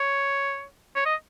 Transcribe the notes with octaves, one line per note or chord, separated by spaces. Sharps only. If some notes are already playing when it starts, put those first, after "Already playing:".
Already playing: C#5
C#5
D#5